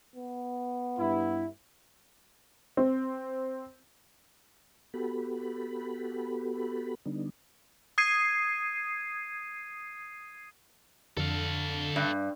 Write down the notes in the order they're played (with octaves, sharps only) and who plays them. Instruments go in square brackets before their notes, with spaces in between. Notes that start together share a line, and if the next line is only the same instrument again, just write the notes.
[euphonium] B3
[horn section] G2 E4
[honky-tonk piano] C4
[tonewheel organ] B3 F#4 G4 A4 B5
D3 G3 B3 D4 D#4
[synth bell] D#6 G#6 C7 D#7
[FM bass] F2 [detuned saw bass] D3 [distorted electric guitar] A4 F5
[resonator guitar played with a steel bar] G2